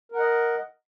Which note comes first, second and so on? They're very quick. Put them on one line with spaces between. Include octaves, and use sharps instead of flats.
A#4 F#5 D#5